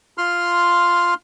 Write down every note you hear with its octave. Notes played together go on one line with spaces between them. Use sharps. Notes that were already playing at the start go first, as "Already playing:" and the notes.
F4 C6 F6